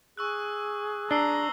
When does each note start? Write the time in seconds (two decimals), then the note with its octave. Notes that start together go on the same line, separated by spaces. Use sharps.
0.17 G#4 C#6 E6 F#6
1.11 D4 A#5 E6 C7 G7